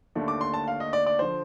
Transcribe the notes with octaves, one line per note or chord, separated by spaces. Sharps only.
D#2 D3 A3 D4
D6
C6
A5
F5
D#5
D5
D5
D3 F3 C5